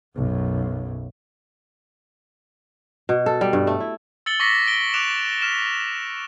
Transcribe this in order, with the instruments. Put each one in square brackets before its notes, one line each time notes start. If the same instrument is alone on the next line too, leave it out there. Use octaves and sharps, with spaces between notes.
[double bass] B1 F#2
[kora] B2
A4
G3
G2
A3
E4
[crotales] E6 A6 C#7 F#7 G7
C#6 D6 A#6 B6 C#7
D7 G7
D6 F#6 D7 E7 F7
F6 B6 E7